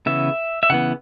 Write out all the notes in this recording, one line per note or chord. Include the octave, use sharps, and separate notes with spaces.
C#3 E3 B3 E5
E5
C#3 E3 B3 F#5